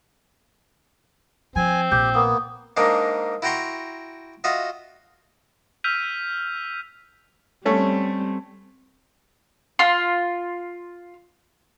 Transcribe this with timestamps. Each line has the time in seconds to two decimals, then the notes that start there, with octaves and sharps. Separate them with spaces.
1.56 F3 C4 G#5
1.92 A#1 G4 G6
2.15 A#3 B3 D#6
2.77 G#2 G#3 A#3 D4
3.42 E4 F#4 G5 A#5 C6 C#6
4.44 F4 F#4 D#5 E5
5.84 E6 F6 G6 B6 D#7 F7
7.65 G3 A3 C4 C#4
9.79 F4 C6